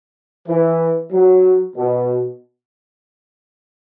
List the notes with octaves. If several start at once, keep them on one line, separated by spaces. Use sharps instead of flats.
E3
F#3
B2